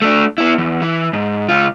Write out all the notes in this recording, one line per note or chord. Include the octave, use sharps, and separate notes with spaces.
A3 D4
B3 E4
E2
E3
G#2
C#2 F4